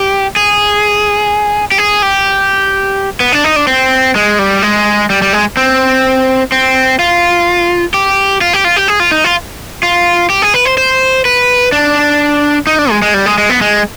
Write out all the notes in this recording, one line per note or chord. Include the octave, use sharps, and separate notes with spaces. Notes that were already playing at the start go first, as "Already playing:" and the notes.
Already playing: G4
G#4
G4
G#4
G4
B3
D4
D#4
D4
C4
G#3
G3
G#3
G3
G3
G#3
C4
C4
F4
G4
F4
G4
F4
G4
G#4
F4
D#4
F4
F4
G4
G#4
B4
C5
C5
B4
D4
D#4
D4
G#3
G#3
G3
G#3
G#3
B3
G#3